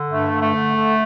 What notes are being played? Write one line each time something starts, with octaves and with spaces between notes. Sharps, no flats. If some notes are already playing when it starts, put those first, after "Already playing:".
Already playing: D3
G2 A3
D3
A3
D3
D3